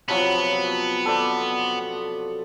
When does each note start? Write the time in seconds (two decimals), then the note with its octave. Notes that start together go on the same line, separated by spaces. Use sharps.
0.09 C3 F3 F#3 B3
1.06 A4 C5 D5